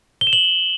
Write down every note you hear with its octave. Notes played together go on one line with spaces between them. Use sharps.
G7
E7
F#7